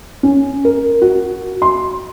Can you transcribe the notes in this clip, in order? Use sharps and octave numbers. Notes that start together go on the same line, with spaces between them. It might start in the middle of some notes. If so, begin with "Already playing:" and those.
C#4
A#4
F#4
C6